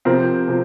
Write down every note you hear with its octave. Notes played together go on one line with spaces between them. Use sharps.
C3 F3 C4 A#4
C3 F3